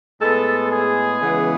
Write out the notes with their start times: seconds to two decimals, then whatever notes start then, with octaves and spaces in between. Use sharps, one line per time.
0.21 A2 G#3 B3 A4
0.71 G#4
1.20 C#3 E3 G#3 B3